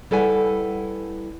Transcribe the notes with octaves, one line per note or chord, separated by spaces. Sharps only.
G3 E4 A4 B4 F#5 G#5